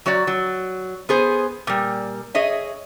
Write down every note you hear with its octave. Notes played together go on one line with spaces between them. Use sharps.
F#3 F#4 C#5 D5
F#3
B3 G#4 C5
A#2 G3
G#4 C#5 D#5 E5